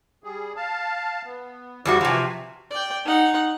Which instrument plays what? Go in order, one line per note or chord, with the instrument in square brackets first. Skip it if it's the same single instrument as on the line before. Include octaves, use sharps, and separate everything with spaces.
[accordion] G3 G#4
F5 A5
B3
[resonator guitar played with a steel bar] F2 G3 F#4 [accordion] E4 G#4 D5
[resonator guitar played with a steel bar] C3 F3 [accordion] E3 F#4 G#5
[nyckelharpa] D5 G5
D#4 F#5